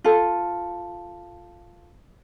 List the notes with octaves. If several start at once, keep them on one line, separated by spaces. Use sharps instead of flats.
F4 A4